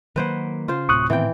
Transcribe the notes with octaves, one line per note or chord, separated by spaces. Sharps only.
D#3 F#3 A#3 B4 C5 F#5
C#3 F4 C5
D1 A2 C3 C#6 D#6 F#6
A2 D#3 E3 B3 C4 G5